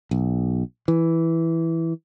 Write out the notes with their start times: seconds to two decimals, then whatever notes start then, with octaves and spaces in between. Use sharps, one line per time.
0.11 B1
0.88 E3